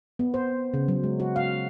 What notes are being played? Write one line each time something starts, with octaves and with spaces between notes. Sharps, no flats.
B3
C5
C#3
F#3
G#3
F#4
F5